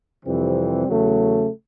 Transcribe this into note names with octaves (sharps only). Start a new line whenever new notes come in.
F2 C3 E3 G3 C4
E2 C#3 F#3 A3